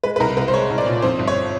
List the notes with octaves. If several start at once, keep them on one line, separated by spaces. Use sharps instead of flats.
G#3 B4
B4
C2 A#4
C2 B4
C5
G#3 C#5
C2
D5
A#2
F2 C5
G1
C#5